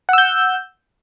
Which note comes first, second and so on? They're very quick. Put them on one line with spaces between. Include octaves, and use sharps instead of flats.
F#5 E6 G6